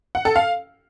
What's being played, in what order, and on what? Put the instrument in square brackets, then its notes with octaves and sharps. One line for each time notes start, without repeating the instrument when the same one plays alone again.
[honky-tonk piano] F#5
A4
F5